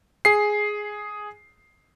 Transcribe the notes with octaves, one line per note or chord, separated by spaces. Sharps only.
G#4 C7